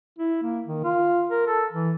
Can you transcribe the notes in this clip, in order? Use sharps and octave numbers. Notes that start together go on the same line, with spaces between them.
E4
A#3
D#3
F4
A#4
A4
E3